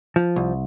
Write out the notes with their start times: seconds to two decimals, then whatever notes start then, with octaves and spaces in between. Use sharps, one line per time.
0.16 F3
0.36 C2